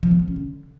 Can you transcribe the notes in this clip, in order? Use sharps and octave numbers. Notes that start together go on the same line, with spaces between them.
F3
B3
F3
C#4
D3